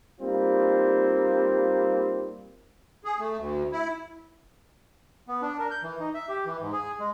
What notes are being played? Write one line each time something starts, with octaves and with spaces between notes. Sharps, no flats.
G3 A#3 C4 D#4 F4
G#4
A3
D2
E4
B3
D4
A#4
G6
E3
D#4
E5
G4
E3
G#2
G#4
G#3